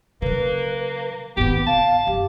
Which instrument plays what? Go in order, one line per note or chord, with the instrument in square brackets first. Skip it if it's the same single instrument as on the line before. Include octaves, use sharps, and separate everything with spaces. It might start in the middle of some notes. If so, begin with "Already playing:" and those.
[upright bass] C#3 F#3 [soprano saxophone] A#3 [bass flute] B4
[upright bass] G#1 D#3 [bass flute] B3 [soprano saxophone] G4
[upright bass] C#3 [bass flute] F5 [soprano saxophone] A5
[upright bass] F#2 [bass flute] G4